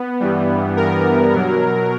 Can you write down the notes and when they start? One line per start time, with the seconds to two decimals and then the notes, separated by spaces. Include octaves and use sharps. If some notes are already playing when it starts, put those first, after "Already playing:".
Already playing: B3
0.20 G2 E3 G3
0.77 A#4
1.34 B2 F#3